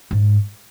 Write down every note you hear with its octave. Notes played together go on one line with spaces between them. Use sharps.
G#2